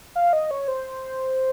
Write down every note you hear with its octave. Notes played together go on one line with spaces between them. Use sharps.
F5
D#5
C#5
C5